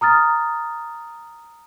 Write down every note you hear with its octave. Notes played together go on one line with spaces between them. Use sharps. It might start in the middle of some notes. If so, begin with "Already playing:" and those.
A#5 D#6 F6 A6